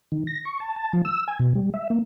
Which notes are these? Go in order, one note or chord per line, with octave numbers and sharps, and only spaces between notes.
D#3
A#6
C#6
A5
A5
F3
E6
G#5
B2
G3
E5
A#3